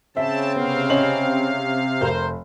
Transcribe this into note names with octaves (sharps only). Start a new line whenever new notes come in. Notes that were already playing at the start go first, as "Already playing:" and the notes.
C#3 C4 E5 A5
C3 B3 F5
C#4 D#5 F#7
F1 A#4 C5